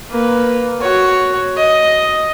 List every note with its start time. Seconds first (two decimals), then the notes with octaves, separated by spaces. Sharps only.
0.10 A#3 B4
0.81 F#4 C#5
1.57 D#5